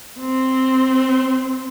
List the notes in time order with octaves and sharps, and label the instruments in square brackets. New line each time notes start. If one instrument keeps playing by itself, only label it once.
[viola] C4